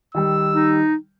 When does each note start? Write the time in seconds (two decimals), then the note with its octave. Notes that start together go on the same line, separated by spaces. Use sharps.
0.15 D#3 G3 G5 E6
0.51 D#4